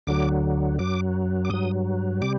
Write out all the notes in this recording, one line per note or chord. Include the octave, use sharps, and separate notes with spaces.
D2 D3 F#3 D6
F#2 F#3 D6
D6
G2 F#3 D#6
C3 G3 D6